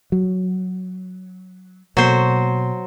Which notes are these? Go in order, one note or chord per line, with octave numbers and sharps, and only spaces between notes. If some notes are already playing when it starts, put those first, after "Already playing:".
F#3
B2 F#3 A#3 C5